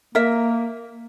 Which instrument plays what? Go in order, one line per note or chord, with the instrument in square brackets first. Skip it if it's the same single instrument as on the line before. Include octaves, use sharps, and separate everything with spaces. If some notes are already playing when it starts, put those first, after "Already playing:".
[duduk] A#3 [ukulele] A#4 E5